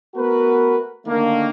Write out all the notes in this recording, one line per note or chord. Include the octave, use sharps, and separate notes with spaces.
A3 B3 F#4 A#4 B4
D3 D#3 A3 A#3